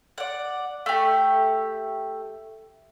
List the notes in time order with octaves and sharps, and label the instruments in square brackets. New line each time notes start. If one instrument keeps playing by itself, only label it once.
[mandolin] D5 F#5
A3 G4